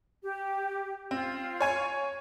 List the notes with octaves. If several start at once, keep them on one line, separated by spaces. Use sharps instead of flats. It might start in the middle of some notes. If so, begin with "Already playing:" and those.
G4
C4 F4
C#5 G#5 G#6